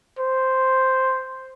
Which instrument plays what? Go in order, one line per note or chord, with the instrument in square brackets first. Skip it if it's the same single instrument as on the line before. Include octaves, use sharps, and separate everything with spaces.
[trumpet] C5